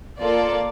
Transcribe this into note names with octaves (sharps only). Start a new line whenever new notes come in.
A#3 F4 A4 D5